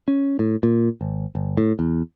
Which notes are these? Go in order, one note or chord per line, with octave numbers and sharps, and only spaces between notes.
C#4
A2
A#2
G#1
G1
A2
E2